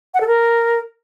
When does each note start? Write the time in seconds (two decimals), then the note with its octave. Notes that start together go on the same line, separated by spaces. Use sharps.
0.14 F#5
0.21 A4
0.27 A#4